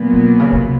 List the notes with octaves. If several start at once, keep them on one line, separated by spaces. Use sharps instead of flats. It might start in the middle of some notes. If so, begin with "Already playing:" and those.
Already playing: A#2 F#3 B3
B2
C#3
C3